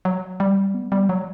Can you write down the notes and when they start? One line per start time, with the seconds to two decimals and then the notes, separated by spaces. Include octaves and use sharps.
0.05 F#3
0.40 G3
0.74 B3
0.92 G3
1.09 F#3